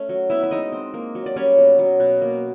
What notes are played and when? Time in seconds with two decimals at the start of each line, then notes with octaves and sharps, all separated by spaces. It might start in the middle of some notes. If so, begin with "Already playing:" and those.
Already playing: A3 C#4
0.09 F#3
0.30 B3 E4 E5
0.43 E5
0.51 G#3 D#4 D#5
0.72 C4
0.94 A#3
1.15 F#3
1.26 D5
1.36 G3 C#4 C#5
1.58 B2
1.79 F#3
2.00 B2
2.21 A#3